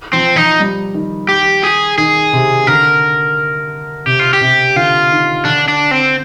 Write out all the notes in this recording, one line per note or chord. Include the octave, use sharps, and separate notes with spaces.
F3 C4
F3 D#4
G3
D#3
G4
G#4
D#3 G#4
C3
D3 A#4
C3 G4
F4
G4
C3
D3 F4
D#3
D3 D4
D4
C4